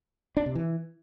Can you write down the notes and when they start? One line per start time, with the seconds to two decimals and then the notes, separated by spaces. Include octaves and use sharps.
0.37 D4
0.46 C3
0.55 E3